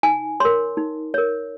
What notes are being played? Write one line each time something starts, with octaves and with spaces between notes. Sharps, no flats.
D#4 G#5
A#4 C#5 C6
D#4
A#4 C#5